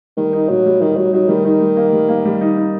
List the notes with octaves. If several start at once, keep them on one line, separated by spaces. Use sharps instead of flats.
D#3 G3
D#4
A#2 F#3
G3
D#3 D#4
F#3 G3
F#3 D#4
D#3 G3
D#3 D#4
G3
A#3
G3
A#3
G3
D#4
D#4